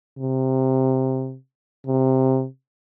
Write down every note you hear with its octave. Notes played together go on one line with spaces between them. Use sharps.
C3
C3